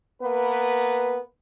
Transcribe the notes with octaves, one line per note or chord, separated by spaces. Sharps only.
A#3 B3 B4